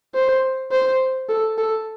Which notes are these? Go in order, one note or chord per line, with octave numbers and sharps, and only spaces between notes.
C5
C5
A4
A4